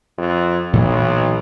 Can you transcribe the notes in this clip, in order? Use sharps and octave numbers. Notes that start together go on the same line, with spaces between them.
F2
B1 A#2 E3 F#3